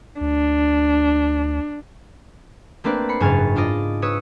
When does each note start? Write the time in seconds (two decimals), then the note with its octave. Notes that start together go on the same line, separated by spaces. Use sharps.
0.21 D2 D4
2.84 A3 A#3 C4 D4 B4 D5
3.09 B5 C7 C#7
3.20 F#1 G#2 F#3 G#5 F6 A6
3.56 D4 F4 D5 D#5
4.02 B4 C#5 D#6 E6